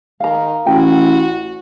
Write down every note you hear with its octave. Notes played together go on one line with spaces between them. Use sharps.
D#3 F5 A#5
A1 F#4 G5 G#5